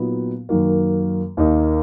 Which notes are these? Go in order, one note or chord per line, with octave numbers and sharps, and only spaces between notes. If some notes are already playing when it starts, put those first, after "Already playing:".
Already playing: A#2 F#3 B3 D#4
F#2 D#3 A#3
D#2 D#3 A#3 D#4